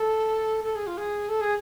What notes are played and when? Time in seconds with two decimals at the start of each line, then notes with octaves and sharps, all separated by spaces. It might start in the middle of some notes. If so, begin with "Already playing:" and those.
Already playing: A4
0.64 A4
0.75 G#4
0.87 F4
0.97 G#4
1.29 A4
1.41 G#4